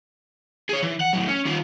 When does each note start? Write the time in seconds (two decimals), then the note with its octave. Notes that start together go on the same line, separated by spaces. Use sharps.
0.69 G#4 C#5
0.82 E3
1.00 F#5
1.13 A2 F#3
1.28 C#4
1.46 D#3 F4